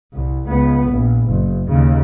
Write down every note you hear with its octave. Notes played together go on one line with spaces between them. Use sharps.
C2
C#2 B3
A#1
F#1
D#2 C#3